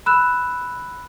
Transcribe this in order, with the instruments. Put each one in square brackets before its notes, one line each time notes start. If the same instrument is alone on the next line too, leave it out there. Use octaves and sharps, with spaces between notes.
[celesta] B5 E6 F#6 E7